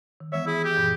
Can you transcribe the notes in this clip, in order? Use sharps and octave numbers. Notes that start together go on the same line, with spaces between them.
D#3
E3 G#3 B3 C#5 E5
E4 G#4
G4
F#2 A#2 E3